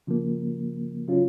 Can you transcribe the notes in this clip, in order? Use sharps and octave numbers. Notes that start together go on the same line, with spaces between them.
C#3 F3 A#3
C#3 F#3 C#4 F4